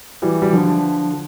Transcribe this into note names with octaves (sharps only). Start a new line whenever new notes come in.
E3 G3
G3
D3 F3